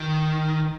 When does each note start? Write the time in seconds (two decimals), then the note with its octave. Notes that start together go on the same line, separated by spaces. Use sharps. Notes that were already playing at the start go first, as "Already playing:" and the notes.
Already playing: D#3